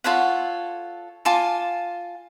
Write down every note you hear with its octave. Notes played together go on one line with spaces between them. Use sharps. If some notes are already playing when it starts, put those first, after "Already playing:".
F4 A4 C#5 F#5
F4 G#5 A5 D6